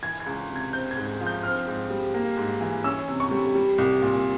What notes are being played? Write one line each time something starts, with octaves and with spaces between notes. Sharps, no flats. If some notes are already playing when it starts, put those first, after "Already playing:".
E3 G#6
G#6
C#2
C3
G#6
C4 G6
G#6
G#2
F3
G6
C4 F6
G#2
G3
A#3
G#2
E3
C#4 E6
C3
C#6
G3
G3
C2
A#2